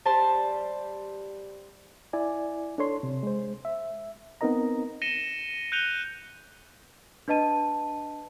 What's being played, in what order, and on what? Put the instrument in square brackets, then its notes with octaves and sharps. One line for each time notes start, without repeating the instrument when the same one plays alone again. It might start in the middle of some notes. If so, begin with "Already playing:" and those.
[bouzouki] G3 C5 A5
[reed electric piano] E4 D5 G#5
D4 A4 C#5 C6
C3
G#3 C5
E5
B3 C4 D#4 A#4 D#5 A#5
[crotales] A#6 C#7 D#7 E7 G7
F#6 G6 C#7 D#7 F7 G7
[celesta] D4 B4 D#5 A5 D#7